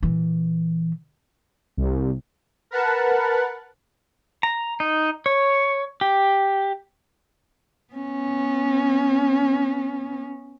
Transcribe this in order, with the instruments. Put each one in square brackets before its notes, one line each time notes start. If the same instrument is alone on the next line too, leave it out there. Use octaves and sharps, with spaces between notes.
[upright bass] A#2 E3
[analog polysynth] C2
[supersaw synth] A#4 B4 F#5 A5
[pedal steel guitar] A#5
D#4
C#5
G4
[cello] B3 C#4